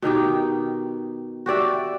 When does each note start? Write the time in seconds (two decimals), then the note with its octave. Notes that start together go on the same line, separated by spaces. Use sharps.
0.02 B2 D#3 D#4 G4
1.46 F#4 G4 D5 E5